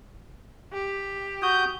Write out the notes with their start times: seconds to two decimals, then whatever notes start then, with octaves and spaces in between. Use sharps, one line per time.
0.73 G4
1.42 F#4 D#6 G6